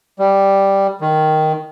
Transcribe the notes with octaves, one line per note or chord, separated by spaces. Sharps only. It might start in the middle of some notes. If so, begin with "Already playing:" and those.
G3
D#3